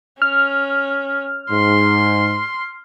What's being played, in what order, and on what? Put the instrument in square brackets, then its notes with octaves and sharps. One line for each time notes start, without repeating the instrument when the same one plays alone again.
[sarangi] C#4 [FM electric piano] F6
[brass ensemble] G#2 [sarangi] C6